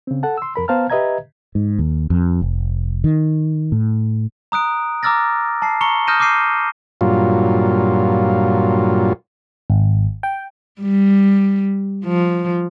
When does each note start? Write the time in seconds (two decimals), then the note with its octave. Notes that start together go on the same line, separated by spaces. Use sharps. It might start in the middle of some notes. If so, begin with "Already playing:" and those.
0.07 C#3 C4
0.23 A4 F#5 A5
0.38 C6 E6
0.56 F2 A#4 B5
0.68 B3 C5 F5 A5 A#5 F6
0.90 G4 B4 D#5 E5 A#5 G#6
1.55 G#2
1.79 D#2
2.10 F2
2.42 F1
3.04 D#3
3.72 A2
4.52 A#5 D#6 F#6 D7
5.03 A#5 D6 E6 F6 A6 A#6
5.62 A5 C7
5.81 A#5 C#6 C#7 G7
6.07 D#6 F6 G6 A#6 D#7 E7
6.20 D6 F6 G6 C7 D#7
7.01 G2 A#2 F#3 F4
9.70 G#1
10.23 G5
10.81 G3
12.05 F3